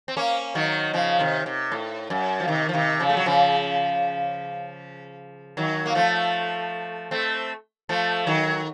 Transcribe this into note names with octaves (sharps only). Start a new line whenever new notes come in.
C4
A#3 C#4
D#3 F#3
C#3 F3
C3 D#3
C3
A2
F#2
F3
C3 D#3
F3
C3 D#3
C#3 F3
A3
F#3
C#3 F3
D#3 F#3
A#3
F3 A3
A3 C4
F3 A3
D#3 F#3